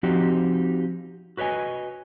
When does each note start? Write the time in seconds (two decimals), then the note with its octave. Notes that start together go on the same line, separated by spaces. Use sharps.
0.03 F3 C4 D#4 F#4 G4
1.37 F#4 B4 C#5 D#5 G#5